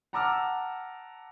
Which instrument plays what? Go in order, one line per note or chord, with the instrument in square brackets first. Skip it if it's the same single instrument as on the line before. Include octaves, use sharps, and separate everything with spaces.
[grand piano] F#5 A5 A#5 D6 E6 F6